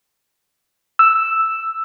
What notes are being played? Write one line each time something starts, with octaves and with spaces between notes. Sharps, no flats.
E6